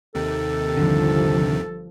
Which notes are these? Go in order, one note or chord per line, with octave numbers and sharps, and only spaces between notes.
D#2 C3 D#3 A4
G1 C2 D3 F3